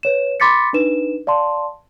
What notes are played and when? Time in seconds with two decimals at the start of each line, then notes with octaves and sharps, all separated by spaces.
0.03 B4 C#5 E7
0.40 B5 C6 D6 A6 B6 C#7
0.73 D4 D#4 B4 E7
1.27 D5 F5 A5 C6